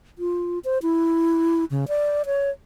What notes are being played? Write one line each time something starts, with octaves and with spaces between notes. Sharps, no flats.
F4
C5
E4
C#3
D5
C#5